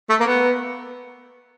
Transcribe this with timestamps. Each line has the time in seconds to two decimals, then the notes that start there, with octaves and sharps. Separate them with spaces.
0.10 A3
0.20 A#3
0.26 B3